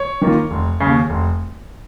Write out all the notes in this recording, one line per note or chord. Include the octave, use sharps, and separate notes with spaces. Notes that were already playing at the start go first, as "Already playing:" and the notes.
Already playing: C#5
D#3 A#3 F4
F1
D#2 C#3
F1